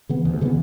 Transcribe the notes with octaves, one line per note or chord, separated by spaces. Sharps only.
C#3 E3 B3
D2
C#3 E3 B3